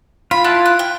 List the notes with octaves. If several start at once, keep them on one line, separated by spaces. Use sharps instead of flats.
F4 B5
E4 F#5 A5
F#6
G5